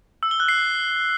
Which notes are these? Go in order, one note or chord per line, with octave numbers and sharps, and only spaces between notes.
E6
G7
F#6
C7